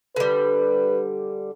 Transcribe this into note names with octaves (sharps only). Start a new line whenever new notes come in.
D3 G3 B4